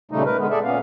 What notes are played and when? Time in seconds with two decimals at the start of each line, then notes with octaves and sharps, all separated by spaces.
0.11 A#2 C#3 G3 A3 D#4
0.25 A#4 B4
0.39 D3 G#3 B3
0.51 G#4 A4 D5 E5
0.64 A#2 B3 C#4 F5